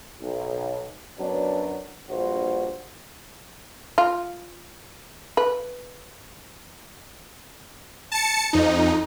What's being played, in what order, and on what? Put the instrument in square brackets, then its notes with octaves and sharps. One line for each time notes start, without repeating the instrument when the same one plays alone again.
[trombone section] B1
F#2 F#3 B3 D4
A#1 G2 A#2 F#4 C5
[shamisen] F4
B4
[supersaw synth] A5 C#7
F2 D#4